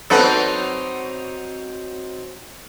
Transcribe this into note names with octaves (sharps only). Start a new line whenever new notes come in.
F#3 C4 D#4 A4 B4 F#5